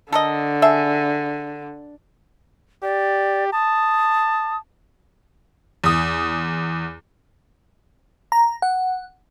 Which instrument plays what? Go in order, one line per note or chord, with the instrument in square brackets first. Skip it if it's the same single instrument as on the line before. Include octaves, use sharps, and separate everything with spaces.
[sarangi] D3 [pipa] A4 A#4 D#5
[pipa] G#4 A4 E5
[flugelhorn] G4 [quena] D5
[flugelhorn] A5 [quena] D#6
[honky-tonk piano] E2 D#6
[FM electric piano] A#5
F#5